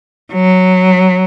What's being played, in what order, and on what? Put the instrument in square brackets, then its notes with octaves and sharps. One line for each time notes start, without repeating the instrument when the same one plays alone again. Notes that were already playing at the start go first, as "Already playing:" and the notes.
[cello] F#3